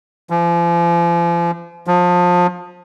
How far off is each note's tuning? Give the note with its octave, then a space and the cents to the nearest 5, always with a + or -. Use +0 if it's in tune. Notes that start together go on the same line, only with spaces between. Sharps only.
F3 -40
F3 +25